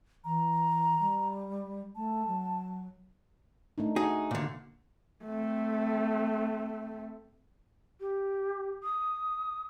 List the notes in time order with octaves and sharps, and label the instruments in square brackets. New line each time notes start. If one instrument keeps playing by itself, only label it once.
[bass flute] E3 [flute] A#5
[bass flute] G3
[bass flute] A3 [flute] A5
[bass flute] F#3
[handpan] A3 D4 D#4
[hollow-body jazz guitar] D#4 G#4 [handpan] F#4
[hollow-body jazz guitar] A#2 D3
[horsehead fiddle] A3 C4
[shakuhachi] G4
D#6